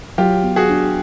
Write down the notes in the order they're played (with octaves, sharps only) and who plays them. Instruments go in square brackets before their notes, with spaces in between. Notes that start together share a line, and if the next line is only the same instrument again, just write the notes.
[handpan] F#3 [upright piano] F4 G4
[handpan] B3
[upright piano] F#4 G#4
[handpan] D4